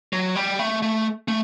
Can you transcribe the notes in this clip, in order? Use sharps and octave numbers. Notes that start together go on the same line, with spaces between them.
F#3
G3
A3
A3
A3